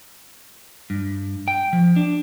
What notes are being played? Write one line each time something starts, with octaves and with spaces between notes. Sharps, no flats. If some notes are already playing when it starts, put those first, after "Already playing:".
G2
G5
F3
D4